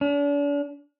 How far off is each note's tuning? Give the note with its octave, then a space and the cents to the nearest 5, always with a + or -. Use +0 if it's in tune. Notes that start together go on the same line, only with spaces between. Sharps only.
D4 -40